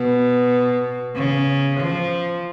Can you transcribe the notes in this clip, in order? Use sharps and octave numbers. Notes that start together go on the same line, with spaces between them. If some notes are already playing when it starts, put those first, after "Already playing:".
Already playing: B2
C#3
F3